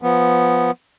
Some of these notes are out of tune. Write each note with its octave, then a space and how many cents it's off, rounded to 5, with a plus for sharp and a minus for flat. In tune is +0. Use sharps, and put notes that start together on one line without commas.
F3 +0 B3 +0